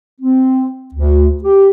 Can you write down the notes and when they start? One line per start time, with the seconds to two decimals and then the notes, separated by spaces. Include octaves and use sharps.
0.21 C4
0.94 D2
1.43 G4